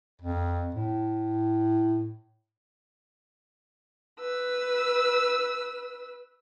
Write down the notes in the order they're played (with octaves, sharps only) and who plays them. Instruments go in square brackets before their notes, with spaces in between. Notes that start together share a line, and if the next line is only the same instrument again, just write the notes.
[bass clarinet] F2
A2
[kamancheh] B4 E6